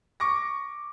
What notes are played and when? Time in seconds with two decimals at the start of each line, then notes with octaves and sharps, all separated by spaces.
0.20 C#6 D6 A#6